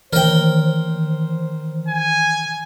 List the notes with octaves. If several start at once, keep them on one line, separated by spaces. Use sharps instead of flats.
D#3 E3 A#4 C5 G5
G#5